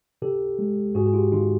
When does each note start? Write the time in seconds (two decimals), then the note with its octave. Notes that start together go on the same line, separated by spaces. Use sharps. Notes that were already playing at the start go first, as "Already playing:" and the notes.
0.22 C3 G4 A4
0.59 G#3
0.95 G#2 F#4 G#4
1.06 G#4
1.14 F4 G4
1.32 D#3 D#4 F4